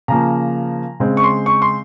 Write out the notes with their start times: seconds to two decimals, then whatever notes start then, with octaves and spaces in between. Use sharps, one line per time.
0.08 C#3 F3 A#3 A#5
1.00 C#3 G#3 C4
1.17 C#6
1.24 C6
1.46 C#6
1.62 C6